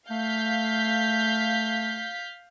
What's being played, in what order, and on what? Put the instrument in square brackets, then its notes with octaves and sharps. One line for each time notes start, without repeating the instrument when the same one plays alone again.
[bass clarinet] A3 [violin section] F5 G6 B6